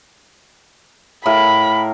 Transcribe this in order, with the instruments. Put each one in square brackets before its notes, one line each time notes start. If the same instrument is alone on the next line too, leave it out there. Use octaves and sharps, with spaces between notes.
[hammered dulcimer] A2 A#4 F5 [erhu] B5